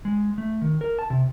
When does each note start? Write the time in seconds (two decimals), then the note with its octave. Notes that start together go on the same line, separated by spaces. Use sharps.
0.05 G#3
0.38 A3
0.62 D#3
0.81 A#4
0.99 A5
1.10 C3